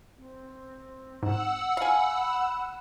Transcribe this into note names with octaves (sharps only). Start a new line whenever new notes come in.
C4
G#2 F#5 E6
F5 G#5 B5